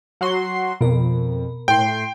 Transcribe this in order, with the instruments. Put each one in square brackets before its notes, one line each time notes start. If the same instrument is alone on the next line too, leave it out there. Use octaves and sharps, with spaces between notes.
[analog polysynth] F#3 F#4 C6
[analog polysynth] F2 [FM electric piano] B2 A#4
[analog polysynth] A2 C6 [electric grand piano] G5